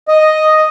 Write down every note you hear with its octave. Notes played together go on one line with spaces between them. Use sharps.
D#5